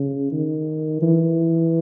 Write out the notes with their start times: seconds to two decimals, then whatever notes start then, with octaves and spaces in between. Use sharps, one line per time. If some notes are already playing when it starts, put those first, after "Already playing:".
Already playing: C#3
0.32 D#3
1.02 E3